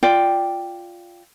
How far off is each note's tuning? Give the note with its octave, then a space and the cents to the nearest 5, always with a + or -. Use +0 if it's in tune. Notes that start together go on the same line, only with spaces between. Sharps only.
F4 +0 D5 +0 G5 +0